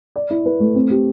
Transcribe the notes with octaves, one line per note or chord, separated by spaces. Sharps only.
D5
E4
B4
A3
C4
G4